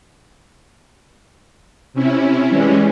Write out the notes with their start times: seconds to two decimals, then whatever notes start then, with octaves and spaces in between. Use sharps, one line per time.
1.94 C3 C#4 E4
2.49 E3 G3 G#3 C#4